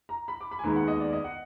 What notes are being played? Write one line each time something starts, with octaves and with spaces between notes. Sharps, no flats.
A#5
B5
D6
B5
G#5
D#2 D#3 G#3 B3 A#5
F#5
D#5
D5
D#5
F#5